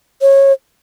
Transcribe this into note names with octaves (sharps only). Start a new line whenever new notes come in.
C#5